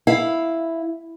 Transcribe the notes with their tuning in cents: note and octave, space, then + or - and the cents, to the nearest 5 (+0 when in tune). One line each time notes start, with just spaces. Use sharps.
E4 +0 F5 +5